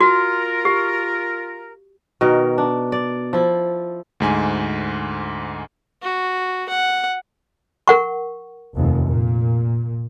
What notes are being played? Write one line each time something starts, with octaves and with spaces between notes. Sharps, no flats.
F4 F#4 A#4
G4
B2 D#3 A#4
D4
D5
F3 E4
D2 G#2 G#5
F#4
F#5
A#4 F#5 C#6
F1 D#2
A#2